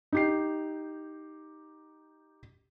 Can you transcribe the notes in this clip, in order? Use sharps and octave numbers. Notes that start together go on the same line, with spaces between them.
D#4 G4 C7